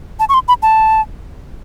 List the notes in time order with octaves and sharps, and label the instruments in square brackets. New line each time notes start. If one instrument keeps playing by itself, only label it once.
[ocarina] A5
C#6
C6
B5
A5